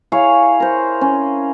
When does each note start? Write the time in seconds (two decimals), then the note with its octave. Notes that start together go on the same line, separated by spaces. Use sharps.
0.12 E4 G#4 C#5 F5
0.60 A#4 C5
1.01 C#4